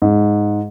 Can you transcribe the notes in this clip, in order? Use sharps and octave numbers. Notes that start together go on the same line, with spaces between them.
G#2